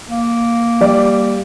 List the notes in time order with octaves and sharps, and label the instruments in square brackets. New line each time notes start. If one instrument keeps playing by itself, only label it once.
[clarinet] A#3
[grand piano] G3 D5